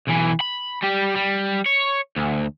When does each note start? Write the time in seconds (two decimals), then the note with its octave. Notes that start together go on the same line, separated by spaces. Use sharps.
0.08 B1 E3
0.41 B5
0.82 G3 G4
1.15 G3
1.66 C#5
2.16 D2